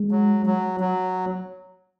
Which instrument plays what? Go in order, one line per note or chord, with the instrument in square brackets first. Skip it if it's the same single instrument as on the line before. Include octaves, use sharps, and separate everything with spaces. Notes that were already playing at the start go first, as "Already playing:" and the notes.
Already playing: [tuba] G#3
[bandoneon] F#3
F#3
F#3